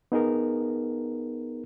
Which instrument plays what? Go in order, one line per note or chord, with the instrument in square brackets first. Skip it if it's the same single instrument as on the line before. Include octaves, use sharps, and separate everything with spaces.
[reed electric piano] B3 D#4 G#4 A#4